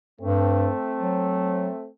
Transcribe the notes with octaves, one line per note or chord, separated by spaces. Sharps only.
G2 A3 C4
F#3